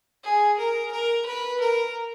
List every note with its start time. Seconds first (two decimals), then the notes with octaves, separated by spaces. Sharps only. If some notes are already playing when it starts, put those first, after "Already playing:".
0.24 G#4
0.59 A#4
0.92 A#4
1.26 B4
1.60 A#4